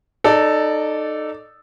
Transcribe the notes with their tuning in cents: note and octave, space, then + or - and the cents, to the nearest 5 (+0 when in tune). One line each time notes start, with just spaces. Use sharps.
D#4 -25 A4 +0 D5 -10